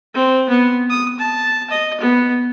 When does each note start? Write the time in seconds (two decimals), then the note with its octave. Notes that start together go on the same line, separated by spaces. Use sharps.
0.14 C4
0.49 B3
0.90 D#6
1.19 A5
1.70 D#5
2.00 B3